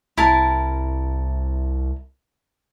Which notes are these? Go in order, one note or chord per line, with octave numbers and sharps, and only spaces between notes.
C2 E4 A#4 A5